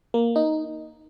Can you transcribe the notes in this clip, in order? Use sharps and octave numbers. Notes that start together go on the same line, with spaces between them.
A#3
D#4